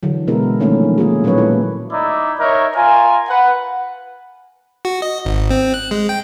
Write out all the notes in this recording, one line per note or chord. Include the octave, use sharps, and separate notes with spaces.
D3 E3 F#3
B2 G#3 B3 E4 A4 A#4
D#3 F3 A3 A#3 C#4 D#4
A#3 F4 G#4
A#2 F#3 G#3 C#4 B4 C#5
A3 E4 A4
D#4 E4 D5
D#4 A#4 C#5 E5
F4 A#4 G#5
B4 F#5
F#4
D#5
G#1
C4
F#6
G#3
G5